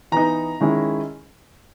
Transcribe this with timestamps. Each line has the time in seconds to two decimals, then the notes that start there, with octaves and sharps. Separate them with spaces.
0.12 E3 B3 D#4 A#5
0.61 D#3 G#3 C#4 E4